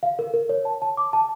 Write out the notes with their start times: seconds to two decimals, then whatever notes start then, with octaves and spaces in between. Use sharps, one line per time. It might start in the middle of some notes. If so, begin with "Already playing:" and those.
0.03 F5
0.19 A#4
0.34 A#4
0.49 C#5
0.65 A5
0.82 A5
0.97 D6
1.13 A5